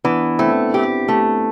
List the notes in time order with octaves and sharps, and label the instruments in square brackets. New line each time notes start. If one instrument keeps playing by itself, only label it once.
[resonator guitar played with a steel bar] E3 [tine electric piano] B3 D4
[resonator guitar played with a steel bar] A3 [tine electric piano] C4 E4
[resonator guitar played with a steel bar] G4
A3